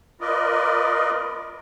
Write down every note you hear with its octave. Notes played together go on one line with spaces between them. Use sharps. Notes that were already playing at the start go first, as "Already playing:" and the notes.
F4 A#4 B4 D5 D#5